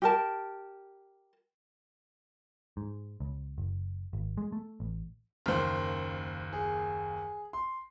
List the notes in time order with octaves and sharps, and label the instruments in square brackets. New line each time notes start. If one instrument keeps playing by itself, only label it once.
[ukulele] G4 A#4 A5
[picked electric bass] G#2
C#2
F#1
G#1
G#3
A3
A1
[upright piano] F#1 D#2 A#3 [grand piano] C5 F6
[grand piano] G#4
C6